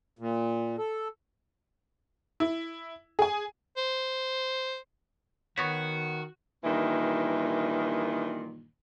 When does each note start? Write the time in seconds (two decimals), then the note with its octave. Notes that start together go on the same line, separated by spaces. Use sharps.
0.19 A#2
0.78 A4
2.40 E4
3.19 G#4 G#5
3.77 C5
5.58 D#3 B3 F#4 C#5 C#6 A#6 B6
6.64 G2 A#2 D#3 E3